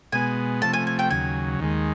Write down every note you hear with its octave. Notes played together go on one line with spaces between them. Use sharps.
B2 G#3 B3 G#5
C3 F3 A3 A5
G#5
G#5
G5
D#2 C#3 F#3 G#5
D#2 D#3 G#3